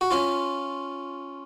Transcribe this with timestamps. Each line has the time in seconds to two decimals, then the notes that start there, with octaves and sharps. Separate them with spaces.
0.01 F#4
0.11 C#4 F4